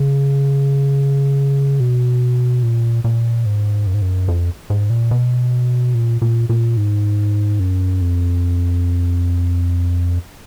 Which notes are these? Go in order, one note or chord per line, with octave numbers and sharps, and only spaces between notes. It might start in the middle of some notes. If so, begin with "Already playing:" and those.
Already playing: C#3
B2
A#2
A#2
G#2
F#2
G#2
F#2
F2
G#2
A#2
B2
A#2
A#2
A#2
G#2
F#2
F2